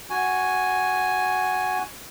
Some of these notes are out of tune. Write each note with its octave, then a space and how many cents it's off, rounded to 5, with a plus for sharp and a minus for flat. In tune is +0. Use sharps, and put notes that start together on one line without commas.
F#4 +0 G#5 +0